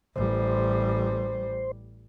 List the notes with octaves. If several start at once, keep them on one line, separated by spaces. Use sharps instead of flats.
A1 G3 C5